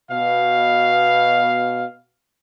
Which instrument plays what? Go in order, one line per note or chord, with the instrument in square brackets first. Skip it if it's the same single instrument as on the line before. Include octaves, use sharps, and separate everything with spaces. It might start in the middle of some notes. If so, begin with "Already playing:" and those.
[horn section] B2 F5